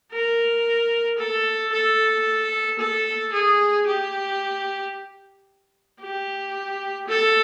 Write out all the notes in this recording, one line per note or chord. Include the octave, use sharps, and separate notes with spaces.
A#4
A4
A4
A4
G#4
G4
G4
A4